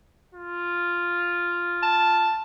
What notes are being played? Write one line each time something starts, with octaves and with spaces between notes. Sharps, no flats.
F4
A5